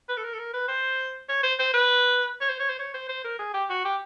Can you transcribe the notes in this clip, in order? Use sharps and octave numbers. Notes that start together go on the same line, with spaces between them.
B4
A4
A#4
A4
A#4
B4
C5
C#5
C5
C5
B4
C#5
C5
C#5
C5
C#5
C5
C5
A#4
G#4
G4
F#4
G4